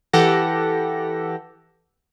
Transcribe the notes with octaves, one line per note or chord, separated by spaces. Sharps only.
E3 G4 A4 F#5 A#6